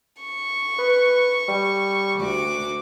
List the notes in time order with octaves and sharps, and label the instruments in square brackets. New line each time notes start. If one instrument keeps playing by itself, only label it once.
[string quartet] C#6
[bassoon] B4
G3
[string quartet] D2 F#4 D6